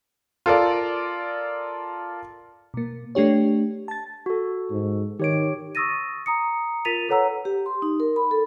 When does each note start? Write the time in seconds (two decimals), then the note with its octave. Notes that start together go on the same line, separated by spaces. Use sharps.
0.46 F4 A4 A#4 D5
2.74 B2 A#3
3.15 A3 D4 G4 C#5
3.88 A5 A6
4.26 F#4 A4
4.71 G#2
5.20 D#3 G4 C#5 D7
5.75 C#6 D#6 E6 A6 A#6 D#7
6.26 A#5 D#6 C#7
6.85 F4 A#4 A6 B6 D#7 F7
7.09 A4 B4 C#5 F#5 A#5 E6
7.45 G4
7.66 C6
7.82 D#4
8.00 A#4
8.16 B5
8.31 A4